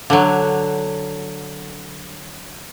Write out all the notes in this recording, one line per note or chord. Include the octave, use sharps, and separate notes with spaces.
D3 F#3